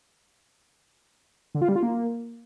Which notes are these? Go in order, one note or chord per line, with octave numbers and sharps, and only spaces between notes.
D3
F4
G3
F4
A#3